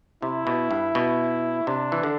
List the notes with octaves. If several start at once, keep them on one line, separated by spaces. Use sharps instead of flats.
C3 E4
B2
G2
B2
C3 D4
E3
D3